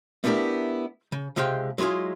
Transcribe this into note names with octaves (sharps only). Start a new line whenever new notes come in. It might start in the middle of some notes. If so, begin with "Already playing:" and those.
A3 B3 D4 E4 G4 A#4
C#3
C#2 C3 G#3 G4 F5 G5
F#3 G#3 E4 F4 G#4